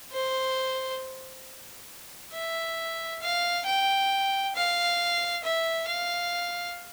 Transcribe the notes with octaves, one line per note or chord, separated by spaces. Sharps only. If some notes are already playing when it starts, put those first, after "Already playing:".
C5
E5
F5
G5
F5
E5
F5